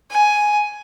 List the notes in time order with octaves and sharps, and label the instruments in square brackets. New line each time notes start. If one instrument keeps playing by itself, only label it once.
[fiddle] G#5